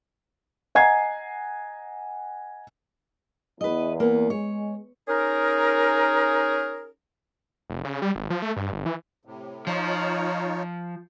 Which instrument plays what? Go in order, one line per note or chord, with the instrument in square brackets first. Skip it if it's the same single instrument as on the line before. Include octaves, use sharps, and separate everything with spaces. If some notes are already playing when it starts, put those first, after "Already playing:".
[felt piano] D#5 F#5 G#5 A#5 G#6 C7
[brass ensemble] E2 [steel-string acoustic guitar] B4 D#5
[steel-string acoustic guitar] A#3 B3
[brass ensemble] G#3 [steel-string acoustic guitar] C#5
[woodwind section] C#4 D#4 G#4 A#4
[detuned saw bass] F1
C#3
G3
G#1
F3
A3
G2
G1
E3
[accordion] A2 C3
[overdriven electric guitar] F3 [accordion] D#4 F4 C#5